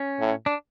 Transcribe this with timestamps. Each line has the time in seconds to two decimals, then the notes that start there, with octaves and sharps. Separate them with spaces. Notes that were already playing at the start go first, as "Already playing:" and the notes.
Already playing: C#4
0.20 A2
0.46 D4